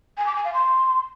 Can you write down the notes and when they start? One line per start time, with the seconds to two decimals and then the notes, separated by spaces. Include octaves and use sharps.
0.17 G#5
0.26 D6
0.35 G#5
0.44 F5
0.53 C6